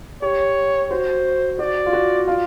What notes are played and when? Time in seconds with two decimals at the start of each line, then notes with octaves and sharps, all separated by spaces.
0.22 G4 C#5
0.91 F#4 C5
1.59 F#4 D5
1.86 F4
1.93 F#4
2.28 F4